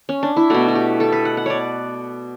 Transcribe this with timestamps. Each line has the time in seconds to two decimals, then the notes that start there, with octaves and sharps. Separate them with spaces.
0.09 C#4
0.23 D4
0.37 E4
0.50 B2 A3 F#4
0.68 F#4
0.75 G4
1.00 A4
1.12 B4
1.25 F#5
1.37 F#5
1.46 C#5 D5